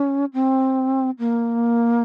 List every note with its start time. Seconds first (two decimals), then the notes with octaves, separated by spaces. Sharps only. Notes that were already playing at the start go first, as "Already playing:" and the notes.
Already playing: C#4
0.34 C4
1.19 A#3